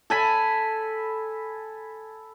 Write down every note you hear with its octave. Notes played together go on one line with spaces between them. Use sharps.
A4 G#5 B5